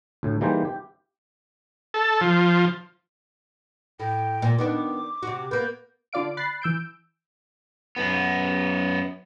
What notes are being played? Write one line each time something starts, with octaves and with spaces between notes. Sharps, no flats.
D2 A2
E3 G3 A#3 D#4 G#4 C5
G4
A4
F3
A2 G5
A#2
D#3 B3 D4 D6
C3 F#4
A#3 B3 G6
D3 F4 D5 F5 D7
B5 F#6 A6 C7
E3 E6 G6 D7
F#2 B3